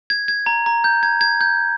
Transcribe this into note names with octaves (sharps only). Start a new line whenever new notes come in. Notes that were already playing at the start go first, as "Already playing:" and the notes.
G#6
G#6
A#5
A#5
G6
G#6
G#6
G6